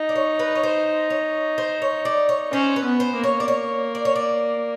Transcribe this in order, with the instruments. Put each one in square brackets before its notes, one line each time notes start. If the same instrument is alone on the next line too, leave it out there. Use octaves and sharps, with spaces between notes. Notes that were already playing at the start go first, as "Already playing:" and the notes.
Already playing: [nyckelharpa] D#4
[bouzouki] D5
C#5
B4
C#5
C5
C#5
C5
C#5
D5
C#5
[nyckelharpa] C#4 [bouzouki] C5
[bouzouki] B4
[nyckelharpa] B3
[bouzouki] C5
[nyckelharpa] A#3
[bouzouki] C#5
D5
C#5
D5
C#5
D5